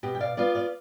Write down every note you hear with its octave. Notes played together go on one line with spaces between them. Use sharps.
B2 G4
G5
D5 F5
B3 F4 D5 F5
D5 F5